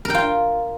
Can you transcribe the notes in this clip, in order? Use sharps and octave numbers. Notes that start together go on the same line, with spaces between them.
F4 A#4 G5